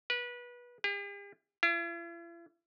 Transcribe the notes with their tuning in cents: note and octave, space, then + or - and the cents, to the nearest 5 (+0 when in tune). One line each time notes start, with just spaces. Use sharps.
B4 -25
G4 +45
E4 +45